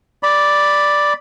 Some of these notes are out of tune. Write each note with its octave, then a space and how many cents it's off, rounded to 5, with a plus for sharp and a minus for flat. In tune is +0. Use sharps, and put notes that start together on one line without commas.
D5 +0 B5 +0